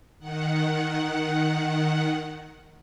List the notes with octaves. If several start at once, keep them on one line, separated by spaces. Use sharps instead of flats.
D#3 F#5